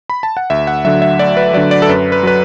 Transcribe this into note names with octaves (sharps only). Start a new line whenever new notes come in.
B5
A5
F#5
D2 E5
F#5
D3 F#3 E5
E5
D2 D5
B4
D3 F#3 D5
D5
A4
F#2 B4
B4
F#3 B4